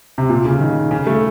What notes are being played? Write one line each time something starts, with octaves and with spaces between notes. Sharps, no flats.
C3
A#2
C#3
D#3
C#3
A3